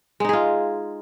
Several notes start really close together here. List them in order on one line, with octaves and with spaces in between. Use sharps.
G#3 D#4 G#4 F4